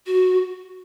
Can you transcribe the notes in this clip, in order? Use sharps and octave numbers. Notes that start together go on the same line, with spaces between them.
F#4